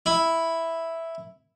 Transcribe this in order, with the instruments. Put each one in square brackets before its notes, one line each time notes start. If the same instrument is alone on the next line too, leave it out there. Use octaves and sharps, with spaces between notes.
[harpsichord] E4